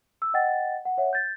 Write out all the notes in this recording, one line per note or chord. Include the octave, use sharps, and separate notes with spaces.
E6
D#5 F#5 G5 A6
F#5
C#5 E5 F#5
G6 A6